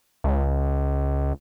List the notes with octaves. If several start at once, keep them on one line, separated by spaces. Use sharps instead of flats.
C#2